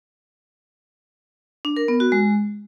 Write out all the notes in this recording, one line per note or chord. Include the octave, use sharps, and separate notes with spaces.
D4
A#4
B3
F#4
G#3